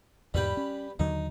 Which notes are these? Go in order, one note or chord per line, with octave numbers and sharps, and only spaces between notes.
E2 G#2 G3 B4 G5
C#4
D#2 D3 F#3 D#4